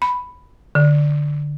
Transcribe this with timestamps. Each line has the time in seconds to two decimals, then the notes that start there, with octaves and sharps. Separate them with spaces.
0.02 B5
0.75 D3